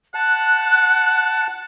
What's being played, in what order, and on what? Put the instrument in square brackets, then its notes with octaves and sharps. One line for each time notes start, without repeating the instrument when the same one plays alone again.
[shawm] F#5 [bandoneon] A5 [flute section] F#6